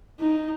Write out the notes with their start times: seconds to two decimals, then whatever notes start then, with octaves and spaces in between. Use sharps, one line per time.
0.19 D#4